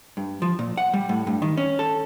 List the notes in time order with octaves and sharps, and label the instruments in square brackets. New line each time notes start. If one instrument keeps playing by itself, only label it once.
[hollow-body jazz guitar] G2
F3
A#2
F#5
G3
A2
G2
D#3
C#4
A4